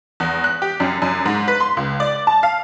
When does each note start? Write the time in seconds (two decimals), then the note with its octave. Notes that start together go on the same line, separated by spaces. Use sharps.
0.20 E2
0.44 F#6
0.62 G4
0.80 F#2
1.02 F#2
1.26 G#2
1.48 B4
1.60 C6
1.77 C#2
2.00 D5
2.27 A5
2.43 F5